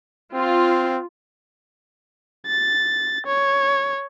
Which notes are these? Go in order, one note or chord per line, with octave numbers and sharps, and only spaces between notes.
C4 F4
A6
C#5